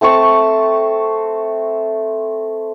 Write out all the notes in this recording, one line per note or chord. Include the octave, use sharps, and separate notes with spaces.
A3 C4 A5 C#6